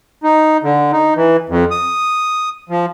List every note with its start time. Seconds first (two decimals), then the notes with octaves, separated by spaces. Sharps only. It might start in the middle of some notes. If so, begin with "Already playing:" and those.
0.24 D#4
0.63 D3
0.93 D#4
1.16 E3
1.49 F2
1.71 D#6
2.69 F3